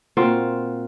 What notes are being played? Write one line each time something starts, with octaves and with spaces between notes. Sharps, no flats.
A#2 C4 F4 F#4